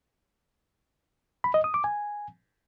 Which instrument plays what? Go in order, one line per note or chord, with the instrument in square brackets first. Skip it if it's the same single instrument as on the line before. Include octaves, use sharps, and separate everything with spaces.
[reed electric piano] B5
D#5
D#6
D6
G#5